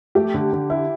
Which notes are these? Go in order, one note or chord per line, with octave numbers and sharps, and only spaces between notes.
A3 G4
D3
D3
E4